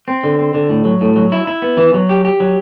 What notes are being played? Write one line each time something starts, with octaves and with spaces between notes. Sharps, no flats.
C4
D3
C4
D3
A2
F#3
A2
F#3
E4
E4
B3
E3
F#3
G4
G4
F#3